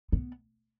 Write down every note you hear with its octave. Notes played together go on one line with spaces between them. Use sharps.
B3